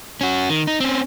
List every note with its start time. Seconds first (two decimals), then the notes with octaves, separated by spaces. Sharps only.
0.21 C#4 F#4
0.50 D#3
0.67 D#4
0.80 C4 C#4